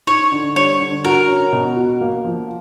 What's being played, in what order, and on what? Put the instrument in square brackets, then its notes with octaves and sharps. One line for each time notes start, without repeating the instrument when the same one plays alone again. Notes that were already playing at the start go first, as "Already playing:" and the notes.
[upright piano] D#4 [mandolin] C#5
[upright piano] D3
[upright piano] G3 [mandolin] C#5
[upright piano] D3
[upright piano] F#4 [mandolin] A#4
[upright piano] C#4
B2
F#4
A#3
F3